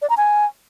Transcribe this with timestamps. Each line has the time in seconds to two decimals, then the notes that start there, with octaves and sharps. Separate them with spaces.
0.02 D5
0.09 A#5
0.17 G#5